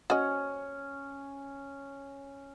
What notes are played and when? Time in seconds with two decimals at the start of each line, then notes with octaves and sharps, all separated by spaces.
0.10 C#4 F#4 D#5